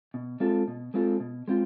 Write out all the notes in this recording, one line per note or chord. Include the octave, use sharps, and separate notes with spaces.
B2
G#3 C4 F4 A4
B2
G#3 C4 F4 A4
B2
G#3 C4 F4